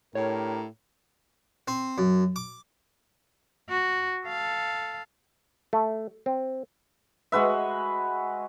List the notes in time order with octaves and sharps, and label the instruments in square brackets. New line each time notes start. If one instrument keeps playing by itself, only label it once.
[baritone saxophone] A2 [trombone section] D4 G4 A#4 [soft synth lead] C#5
[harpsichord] C4
F#2
D6
[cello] F#4
A4 F5
[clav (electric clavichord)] A3
C4
[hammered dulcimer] G#3 F#4 B4 E5